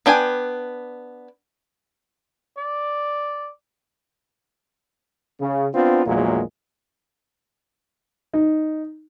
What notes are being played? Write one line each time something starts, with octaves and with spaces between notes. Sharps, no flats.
B3 D4 G5 G#5
D5
C#3
B3 C4 D4 F4
A#1 E2 A#2 F#3 G#3 A#3
D#4